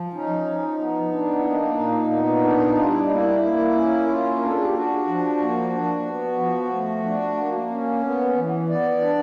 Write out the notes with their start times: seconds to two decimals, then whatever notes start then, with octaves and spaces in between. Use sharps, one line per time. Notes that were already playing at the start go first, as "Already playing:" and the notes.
Already playing: F3
0.13 C#4 D#4
0.46 F3
0.79 B3
1.12 D4
1.39 E4
1.45 A#3 D#4
1.78 A#2
2.11 B3
2.44 D4
2.76 G3 F4
2.89 E4
3.00 D#4
3.10 A#3 E4
3.42 A#3
3.75 C#4
4.09 A#3 F4
4.36 A#4
4.41 D4 A4
4.56 G#4
4.65 G4
4.74 D4 F#4
5.07 F3
5.40 A#3
5.73 D4
6.06 B3
6.39 F3
6.72 A3
7.04 D4
7.37 A#3
7.70 C#4
8.03 B3
8.36 E3
8.69 B3 D5
9.02 D4